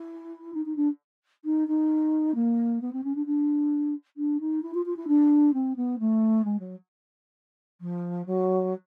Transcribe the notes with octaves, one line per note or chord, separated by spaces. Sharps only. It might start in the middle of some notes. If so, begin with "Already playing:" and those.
Already playing: E4
D#4
D#4
D4
D#4
D#4
A#3
B3
C4
C#4
D4
D4
D4
D#4
E4
F4
F4
E4
D4
C4
B3
A3
G#3
F#3
F3
F#3